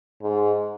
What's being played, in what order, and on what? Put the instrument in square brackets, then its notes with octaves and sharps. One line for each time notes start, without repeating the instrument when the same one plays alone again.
[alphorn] G#2